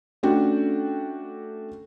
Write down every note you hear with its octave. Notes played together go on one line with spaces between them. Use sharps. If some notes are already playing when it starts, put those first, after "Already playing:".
A3 C#4 D4 F#4 G5